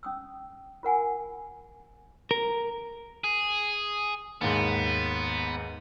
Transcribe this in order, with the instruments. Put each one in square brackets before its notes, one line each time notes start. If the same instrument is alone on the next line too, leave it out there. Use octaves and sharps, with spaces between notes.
[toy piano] C#4 D#6 E6
F4 A#4 F#5 G#5
[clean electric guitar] A#4
[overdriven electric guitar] G#4
[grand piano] D#2 G#2 [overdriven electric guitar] B3